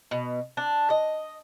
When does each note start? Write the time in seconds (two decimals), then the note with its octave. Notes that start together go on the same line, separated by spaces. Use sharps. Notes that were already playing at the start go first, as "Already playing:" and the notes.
0.11 B2
0.57 D4
0.90 D#5